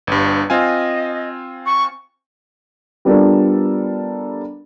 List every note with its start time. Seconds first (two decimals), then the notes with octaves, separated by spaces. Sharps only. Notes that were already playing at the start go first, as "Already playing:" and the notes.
0.07 G1 G2
0.50 C4 F4 D#5 G#5
1.65 C#6
3.05 G3 B3 D4 F4 A4 A#4